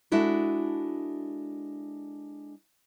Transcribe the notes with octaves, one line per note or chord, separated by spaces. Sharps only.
G#3 D4 E4 F#4 A4